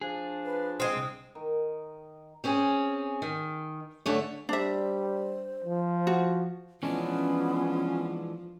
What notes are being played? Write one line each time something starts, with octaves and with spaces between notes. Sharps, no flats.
F3 D4 G#4
B4
G#3 C4 D#6
C2
D#3
C4 C#4 G#4
D#3
D3 A3 C#5
G3 D4 C5 E5
F3
F#4
E3 F3 G#3 B3 C#4 D4